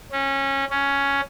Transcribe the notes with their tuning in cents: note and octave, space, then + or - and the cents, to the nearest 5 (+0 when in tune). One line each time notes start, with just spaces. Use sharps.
C#4 -20
C#4 +5